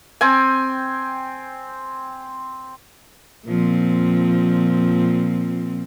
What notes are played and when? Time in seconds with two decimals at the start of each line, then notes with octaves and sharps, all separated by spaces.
0.21 C4 G5 G#5
3.46 A#2 F3 C4